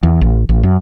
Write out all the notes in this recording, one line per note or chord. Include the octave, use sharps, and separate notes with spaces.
E2
A1
A1
F#2